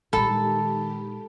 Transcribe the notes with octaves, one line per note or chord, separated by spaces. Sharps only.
A#2 D#3 G#3 G4 A4 B5